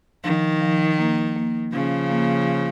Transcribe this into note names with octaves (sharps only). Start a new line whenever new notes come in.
D#3 F3
F3
A#3
A#3
C#3 F3 C#4
A#3